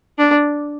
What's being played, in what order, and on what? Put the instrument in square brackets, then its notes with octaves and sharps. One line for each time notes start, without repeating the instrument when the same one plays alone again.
[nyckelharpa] D4